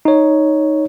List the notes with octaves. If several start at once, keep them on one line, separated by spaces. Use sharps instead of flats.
D#4 C#5